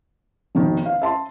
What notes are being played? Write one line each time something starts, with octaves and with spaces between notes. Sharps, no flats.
F1 B2 D#3
F5
E5 A5 C6